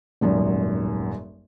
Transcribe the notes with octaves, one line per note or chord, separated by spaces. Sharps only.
D#1 G#1 F#2